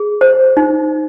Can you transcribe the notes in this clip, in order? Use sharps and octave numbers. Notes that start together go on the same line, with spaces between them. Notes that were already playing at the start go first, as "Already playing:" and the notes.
Already playing: G#4
C5
D#4